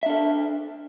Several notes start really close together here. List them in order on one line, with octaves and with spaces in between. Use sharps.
E5 D4 A4